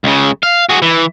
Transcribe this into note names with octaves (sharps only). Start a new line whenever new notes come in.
C#2 C#3
F5
F#4 G#4
E3